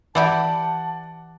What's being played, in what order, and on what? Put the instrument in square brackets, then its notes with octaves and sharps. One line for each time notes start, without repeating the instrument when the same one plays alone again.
[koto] E3 E4 G4 [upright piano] D5 F#5 [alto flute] A5